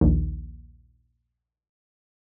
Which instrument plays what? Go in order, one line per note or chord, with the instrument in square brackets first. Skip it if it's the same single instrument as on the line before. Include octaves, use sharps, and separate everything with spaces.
[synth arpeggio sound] A#1 D#2